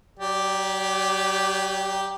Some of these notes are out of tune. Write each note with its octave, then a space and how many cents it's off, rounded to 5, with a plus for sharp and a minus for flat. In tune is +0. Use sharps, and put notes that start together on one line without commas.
F#3 +40 G4 +0 D5 +0